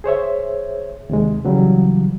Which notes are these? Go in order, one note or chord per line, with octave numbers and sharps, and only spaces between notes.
G#4 C5 C#5 E5
D#2 C3 G#3
C#3 E3 F#3 G3